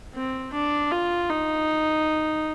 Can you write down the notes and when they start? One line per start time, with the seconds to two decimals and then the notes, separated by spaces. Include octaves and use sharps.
0.15 C4
0.53 D4
0.92 F4
1.29 D#4